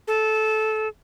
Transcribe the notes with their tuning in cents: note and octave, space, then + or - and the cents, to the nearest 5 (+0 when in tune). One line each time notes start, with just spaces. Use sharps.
A4 -15